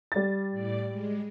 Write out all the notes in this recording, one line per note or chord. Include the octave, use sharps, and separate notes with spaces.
G3 A6
A2 D5
G#3